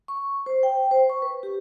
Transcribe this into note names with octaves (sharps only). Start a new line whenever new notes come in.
C#6
C5
G5
C5
C#6
B4
G4